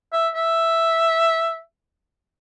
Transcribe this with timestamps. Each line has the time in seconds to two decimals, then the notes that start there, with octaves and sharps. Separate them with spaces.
0.13 E5
0.34 E5